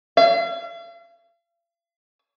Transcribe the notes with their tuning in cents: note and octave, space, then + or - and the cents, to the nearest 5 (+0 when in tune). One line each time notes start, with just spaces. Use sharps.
F5 -45